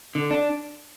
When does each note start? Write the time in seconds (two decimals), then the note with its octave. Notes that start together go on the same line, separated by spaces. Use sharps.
0.15 D3
0.31 D4